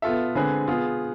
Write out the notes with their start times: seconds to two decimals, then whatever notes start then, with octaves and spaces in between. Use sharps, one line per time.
0.02 B3 F4 A4 E5
0.35 D3 G#3 C4 G#4 B4
0.68 B3 F4 G#4